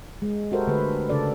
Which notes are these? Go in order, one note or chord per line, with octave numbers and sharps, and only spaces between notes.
G#3
F#4 G4 A4 A#4 C5 E5
D3 A3 G#4 B4
C#3 D4 A4 D5